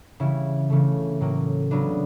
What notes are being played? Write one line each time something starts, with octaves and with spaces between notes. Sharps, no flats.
C#3 E3 G3 E4
C#3 E3 A3
A2 F#3 A#3 C#4
C#3 F#3 B3 D4